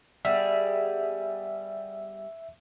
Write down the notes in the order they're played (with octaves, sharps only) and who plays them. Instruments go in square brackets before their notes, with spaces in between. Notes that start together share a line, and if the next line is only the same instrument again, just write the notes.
[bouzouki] G3 B3 G#4 [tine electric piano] E5